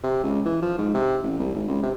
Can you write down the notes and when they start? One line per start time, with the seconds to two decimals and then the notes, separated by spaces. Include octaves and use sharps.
0.03 C3
0.23 C#2
0.45 E3
0.62 F3
0.78 G#2
0.94 C3
1.23 A1
1.39 C2
1.54 G#1
1.68 C#2
1.82 C3